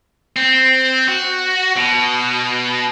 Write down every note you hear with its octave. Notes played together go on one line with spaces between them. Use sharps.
C4
F#4
B2